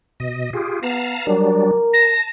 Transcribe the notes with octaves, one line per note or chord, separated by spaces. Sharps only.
B2 D#5
F4 G4 G#4
B3 F5 A5 A#5
F#3 G3 D4 A#4
A5 A#6